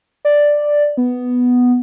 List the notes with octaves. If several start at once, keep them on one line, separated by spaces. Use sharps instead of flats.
D5
B3